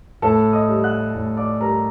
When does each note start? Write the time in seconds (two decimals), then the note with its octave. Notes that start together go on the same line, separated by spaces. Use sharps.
0.22 A2 A4 A5
0.53 D#5 D#6
0.69 G3
0.84 F#5 F#6
1.15 A2
1.37 D5 D6
1.60 G3 A#4 A#5